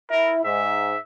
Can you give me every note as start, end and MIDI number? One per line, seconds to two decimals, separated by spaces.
0.11 0.41 64
0.11 0.33 70
0.44 0.93 44
0.44 0.98 76